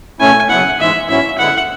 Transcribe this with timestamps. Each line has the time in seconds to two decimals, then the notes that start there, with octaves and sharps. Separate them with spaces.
0.20 B2 A3 C#4 E4 G#5
0.49 C#3 F#3 B3 E4 F#5
0.79 G#2 E3 G#3 E5
1.09 G#2 F#3 C#4 E4 E5
1.38 D3 G#3 B3 E4 F#5